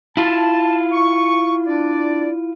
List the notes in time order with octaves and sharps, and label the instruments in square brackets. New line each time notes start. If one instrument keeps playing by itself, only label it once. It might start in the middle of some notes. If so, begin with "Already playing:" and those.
[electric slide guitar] E4 F4 [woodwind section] A5
[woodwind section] C#6
D4 D5